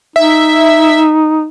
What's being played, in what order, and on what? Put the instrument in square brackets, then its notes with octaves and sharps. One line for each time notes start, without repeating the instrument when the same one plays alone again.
[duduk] D#4 [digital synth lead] E5